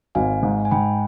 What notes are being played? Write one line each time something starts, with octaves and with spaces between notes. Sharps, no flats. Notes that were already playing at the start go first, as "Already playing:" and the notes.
G#1 F5 G#5
G#2
G#5
G#2 G5 B5